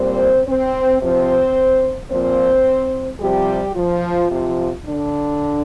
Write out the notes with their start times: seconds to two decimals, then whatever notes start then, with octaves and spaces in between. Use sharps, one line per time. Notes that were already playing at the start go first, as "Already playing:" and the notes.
Already playing: A#2 G3 C4 C5
0.47 C4 C5
1.02 C3 F3 C4 C5
2.11 A#2 F3 C4 C5
3.21 C3 F3 G3 G4
3.75 F3 F4
4.30 C3 F3
4.85 D3 D4